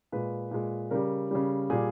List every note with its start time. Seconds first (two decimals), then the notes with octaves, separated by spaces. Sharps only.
0.12 A#2 G#3 B4
0.51 A#2 G#3
0.91 C#3 G3 A#4
1.31 C#3 G3
1.70 A#2 G3 G#4